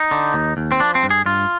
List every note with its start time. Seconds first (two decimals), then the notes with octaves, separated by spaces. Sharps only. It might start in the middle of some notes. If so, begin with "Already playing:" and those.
Already playing: D#4
0.11 D3
0.34 D#2
0.57 D#2
0.72 C4
0.80 F3 D4
0.95 C4
1.03 G2
1.10 G#4
1.26 G2 F4